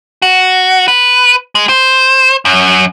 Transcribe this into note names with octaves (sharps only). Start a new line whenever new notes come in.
F#4
B4
G#3
C5
F#2